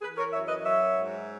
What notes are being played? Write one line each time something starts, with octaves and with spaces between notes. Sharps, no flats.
E3 G#4 B4
A#4 C#5
F#2 C#5 E5
B4 D#5
F#3 C#5 E5
G#2